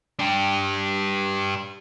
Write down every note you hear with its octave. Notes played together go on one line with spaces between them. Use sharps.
D4 G4